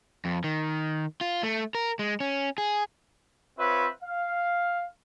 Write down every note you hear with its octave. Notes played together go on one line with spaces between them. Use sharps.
F2
D#3
F4
A3
A#4
G#3
C#4
G#4
C4 F4 B4 C#5 E5
F5